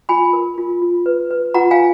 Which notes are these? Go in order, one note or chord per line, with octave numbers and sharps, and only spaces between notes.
F4 G#5 B5
A#4
F4
F4
B4
B4
F4 F#5 A#5
F5 G#5